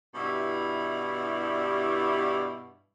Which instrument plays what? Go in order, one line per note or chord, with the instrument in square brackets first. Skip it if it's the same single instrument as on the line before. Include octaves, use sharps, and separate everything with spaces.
[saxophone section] G2 B2 E3 G3 E4